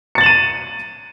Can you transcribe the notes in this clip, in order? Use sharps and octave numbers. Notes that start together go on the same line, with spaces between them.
A6 C#7 D#7 E7 F#7